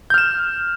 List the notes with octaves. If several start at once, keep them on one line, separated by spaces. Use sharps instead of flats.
F6 G6 E7